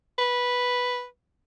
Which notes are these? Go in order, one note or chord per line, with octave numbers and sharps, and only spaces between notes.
B4